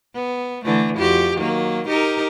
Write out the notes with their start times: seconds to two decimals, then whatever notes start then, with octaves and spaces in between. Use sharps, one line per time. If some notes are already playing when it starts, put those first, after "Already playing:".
0.15 B3
0.65 D3 E3 A3
0.97 F2 F#4 G4
1.37 D#3 F#3 A#3
1.88 D#4 G4 A#4